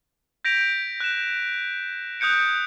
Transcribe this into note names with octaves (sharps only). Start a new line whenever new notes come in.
G6 A#6 B6 D7 F7
F#6 G6 E7
D#6 F#6 G6 C#7 D7